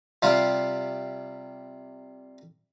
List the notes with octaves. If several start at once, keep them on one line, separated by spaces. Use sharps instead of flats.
C3 G3 F4